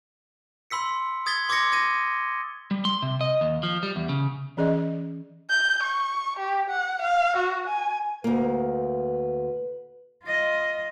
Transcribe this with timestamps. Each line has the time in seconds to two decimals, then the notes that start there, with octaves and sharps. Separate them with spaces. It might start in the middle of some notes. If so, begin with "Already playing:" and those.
0.70 B5 C6 E6 B6 C#7
1.26 D#6 G#6 A6 B6 G7
1.49 C6 D6 E6 G#6 A#6 C#7
1.72 G#6 A#6 D#7
2.71 G3
2.85 C6
3.02 C3
3.21 D#5
3.41 D#2
3.63 F3
3.83 G3
3.96 E2
4.09 C#3
4.57 E3 C#4 G#4 D5 D#5
5.50 G6
5.83 C#6
6.39 G4
6.70 F#5
7.02 F5
7.37 F#4
7.67 G#5
8.24 D2 A#3 B4
10.24 F4 D#5